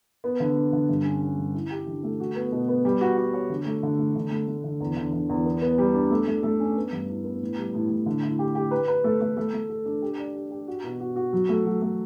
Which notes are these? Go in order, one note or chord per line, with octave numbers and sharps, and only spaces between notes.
B3
D3
D4
D3
G2
C#4
C#4
G2
E4
G4
D3
A3
F#4
B3
B2
B3
G3
F#4
F#4
C#5
D3
A3
D3
A3
D3
A3
A3
D3
E2
D3
D3
E2
B3
B3
G3
D4
A3
A3
A3
C#4
B3
G2
E4
B3
A2
G3
A2
A2
D3
E4
G4
G4
B4
B4
A3
A3
A3
A3
A4
D4
G4
D5
G4
G4
F#4
B2
F#4
F#4
F#3
A3
F#3
A3